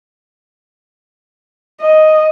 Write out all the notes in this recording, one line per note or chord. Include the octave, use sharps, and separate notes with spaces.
D#5